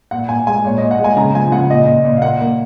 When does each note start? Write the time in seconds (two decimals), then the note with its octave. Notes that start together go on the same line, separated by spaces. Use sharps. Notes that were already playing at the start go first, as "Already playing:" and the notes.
0.11 A#2 F#5
0.29 A#2 G#5
0.47 G#3 G#5
0.64 A#2 C#5
0.78 D#5
0.81 A#2
0.91 F#5
0.99 G#3
1.04 G#5
1.17 C#3 A#5
1.35 F3 G#5
1.52 C#3 F#5
1.70 A#2 D#5
1.87 A#2
2.05 A#2
2.16 F5
2.22 A#3 F#5
2.41 A#3